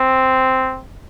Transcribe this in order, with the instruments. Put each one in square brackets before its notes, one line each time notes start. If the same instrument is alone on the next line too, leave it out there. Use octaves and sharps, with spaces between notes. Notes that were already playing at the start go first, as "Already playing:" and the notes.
Already playing: [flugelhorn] C4